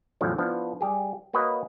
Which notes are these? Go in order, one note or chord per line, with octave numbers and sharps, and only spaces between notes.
E2 A2 D3 F3 F#3
F3 B3 D4 E4
G3 G4 G#4
A#3 F#4 B4 C#5 D#5